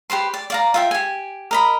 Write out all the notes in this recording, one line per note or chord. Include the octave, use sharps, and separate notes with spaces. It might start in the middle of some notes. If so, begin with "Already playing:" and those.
G4 B4 C5 C6
D5
D5 F5 A#5
F4 E5 G5
G4 G#5
A#4 D#5 B5